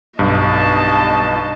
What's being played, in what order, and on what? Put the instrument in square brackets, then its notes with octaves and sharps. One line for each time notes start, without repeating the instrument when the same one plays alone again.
[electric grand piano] B1 G2 [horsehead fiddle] D#5 A5